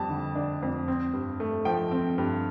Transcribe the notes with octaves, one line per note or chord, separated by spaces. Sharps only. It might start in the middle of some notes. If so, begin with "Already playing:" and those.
Already playing: F2 G3 A5
D3
D4
F2
C4
G2
A3
F3 G5
C4
G2